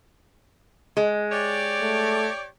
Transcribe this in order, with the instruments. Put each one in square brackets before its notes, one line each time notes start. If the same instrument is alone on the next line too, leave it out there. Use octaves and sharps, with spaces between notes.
[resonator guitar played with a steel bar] G#3
[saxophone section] G4 C#5 D5
[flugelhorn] A3